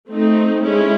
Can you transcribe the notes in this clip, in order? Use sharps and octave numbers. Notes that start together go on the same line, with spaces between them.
A3 C4 D#4
G#3 C#4 E4